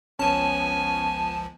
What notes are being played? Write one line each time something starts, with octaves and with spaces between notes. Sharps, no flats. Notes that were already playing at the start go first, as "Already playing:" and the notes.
G1 C#2 F3 B3 C#4 G#5 A5